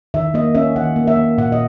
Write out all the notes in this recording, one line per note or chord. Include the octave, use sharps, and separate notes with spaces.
D#3 E5
A#3 D#5
C#4 E5
D#3 F#5
A#3
E5
A#3
A#2 F#5
D#5